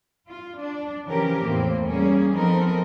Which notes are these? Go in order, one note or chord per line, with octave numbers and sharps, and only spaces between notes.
F4
D4
C#3 E3 F3 C#4 G4 A#4
E2 A2 A#3 C4
G3 A#3 C#4 G#4
F3 B3 C4 D#4 A4 A#4